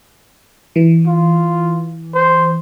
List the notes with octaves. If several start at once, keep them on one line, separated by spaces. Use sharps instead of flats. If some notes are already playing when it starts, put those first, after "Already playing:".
E3
F4
C5